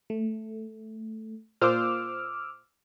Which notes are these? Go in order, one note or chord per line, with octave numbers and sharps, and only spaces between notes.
A3
A#2 F4 C5 D6 E6 F6